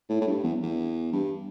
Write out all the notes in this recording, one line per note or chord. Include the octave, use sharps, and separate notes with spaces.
A2
A2
G2
E2
E2
G2